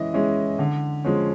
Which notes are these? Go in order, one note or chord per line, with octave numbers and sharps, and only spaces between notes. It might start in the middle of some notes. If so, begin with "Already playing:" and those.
Already playing: E3 G#3 C#4 E4 D#5
G#3 C#4 E4
D3
F3 G#3 C#4